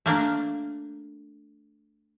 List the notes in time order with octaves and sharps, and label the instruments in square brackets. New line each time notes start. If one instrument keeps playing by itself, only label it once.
[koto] A3 A#3 D4